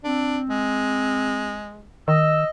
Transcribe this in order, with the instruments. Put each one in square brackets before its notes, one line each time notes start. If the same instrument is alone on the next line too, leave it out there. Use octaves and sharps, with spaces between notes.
[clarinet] C4 [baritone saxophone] D4
[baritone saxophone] G#3
[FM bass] D#3 [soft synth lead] D#5 [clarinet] E6